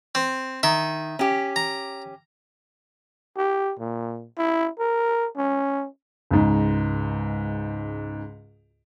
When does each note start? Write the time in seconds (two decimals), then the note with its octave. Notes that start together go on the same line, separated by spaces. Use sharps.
0.15 C4
0.63 D#3 E5
1.19 C#4 G4
1.56 A#5
3.37 G4
3.79 A#2
4.38 E4
4.79 A#4
5.37 C#4
6.31 C#2 G#2